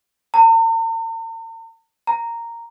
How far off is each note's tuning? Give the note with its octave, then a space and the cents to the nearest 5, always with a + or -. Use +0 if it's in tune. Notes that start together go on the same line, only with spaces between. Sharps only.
A#5 -45
A#5 -10